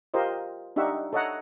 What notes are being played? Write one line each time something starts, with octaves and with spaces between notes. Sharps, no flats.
F4 G4 A#4 C5 D#5
D4 D#4 G4 E5 F#5 C#6
A4 C#5 D#5 E5 F#5 A#5